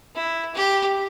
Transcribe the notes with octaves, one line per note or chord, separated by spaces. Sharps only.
E4
G4